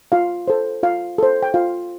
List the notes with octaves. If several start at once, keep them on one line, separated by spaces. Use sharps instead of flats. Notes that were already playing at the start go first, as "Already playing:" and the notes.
F4 F5
A4 C5
F4 F5
A4 C5
G5
F4 F5